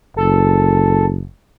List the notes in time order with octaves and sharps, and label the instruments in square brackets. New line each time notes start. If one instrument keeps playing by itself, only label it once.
[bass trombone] F#1 [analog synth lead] A4